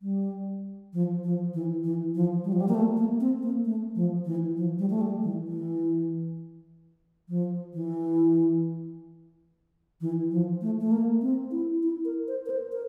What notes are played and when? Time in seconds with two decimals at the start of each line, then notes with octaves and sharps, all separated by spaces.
0.02 G3
0.93 F3
1.24 F3
1.54 E3
1.84 E3
2.15 F3
2.44 G3
2.53 F3
2.60 G3
2.69 A#3
2.75 A3
2.97 A#3
3.20 C4
3.43 A#3
3.65 A3
3.95 F3
4.25 E3
4.57 F3
4.79 G3
4.90 A3
5.01 G3
5.24 E3
5.47 E3
7.29 F3
7.74 E3
10.01 E3
10.31 F3
10.62 A3
10.81 A3
10.92 A#3
11.22 C4
11.52 E4
11.83 E4
12.05 A#4
12.28 C5
12.46 A#4
12.50 C5
12.72 A#4